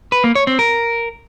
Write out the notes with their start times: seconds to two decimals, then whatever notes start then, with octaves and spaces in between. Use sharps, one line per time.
0.12 B4
0.24 A#3
0.35 C#5
0.47 C4
0.59 A#4